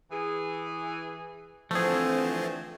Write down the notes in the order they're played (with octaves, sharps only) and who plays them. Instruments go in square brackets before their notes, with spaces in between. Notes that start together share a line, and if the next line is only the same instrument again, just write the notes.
[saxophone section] E3 G#4
[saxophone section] D3 E3 [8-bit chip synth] F3 C4 [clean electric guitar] A3 G#4